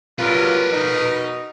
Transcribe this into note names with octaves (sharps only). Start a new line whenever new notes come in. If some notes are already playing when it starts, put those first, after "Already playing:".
F#3 G3 F4 A#4 B4
B2 D#4